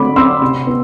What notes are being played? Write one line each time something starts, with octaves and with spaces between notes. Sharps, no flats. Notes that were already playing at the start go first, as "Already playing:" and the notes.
Already playing: D3 A3 C4 B5 D6
C4 C6 E6
C3
B3